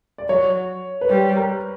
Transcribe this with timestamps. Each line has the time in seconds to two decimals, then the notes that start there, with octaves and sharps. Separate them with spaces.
0.18 D5
0.29 F#3 C#5
1.01 B4
1.09 G3 C5
1.36 A#4